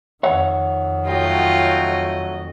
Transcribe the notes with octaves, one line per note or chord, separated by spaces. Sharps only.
F2 D#3 C#5 E5 F#5
F#3 A3 F4 D#5 G5